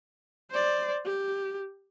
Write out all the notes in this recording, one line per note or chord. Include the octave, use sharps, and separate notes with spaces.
C5 D5
G4